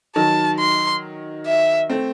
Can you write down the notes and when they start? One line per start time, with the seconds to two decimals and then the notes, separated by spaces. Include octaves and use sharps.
0.16 D#3 F#3 A5
0.60 C6
1.46 E5
1.90 A3 C4